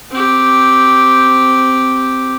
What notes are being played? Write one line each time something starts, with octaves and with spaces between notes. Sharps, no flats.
C4 G4